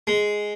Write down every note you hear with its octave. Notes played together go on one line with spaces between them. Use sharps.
G#3